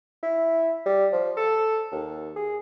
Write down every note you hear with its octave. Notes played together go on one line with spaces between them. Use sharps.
E4
G3
F3
A4
D#2
G#4